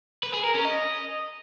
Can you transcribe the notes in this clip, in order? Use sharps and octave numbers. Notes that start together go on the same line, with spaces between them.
B4
G#4
A#4
C#4
D#5